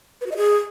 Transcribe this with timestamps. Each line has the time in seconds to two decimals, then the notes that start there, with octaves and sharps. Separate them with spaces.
0.21 B4
0.26 F#4
0.31 D#5
0.36 G#4